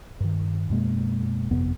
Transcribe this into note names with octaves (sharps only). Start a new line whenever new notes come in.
G2 D#3
F#2 B2 G#3 A#3
G1 F2 C3 B3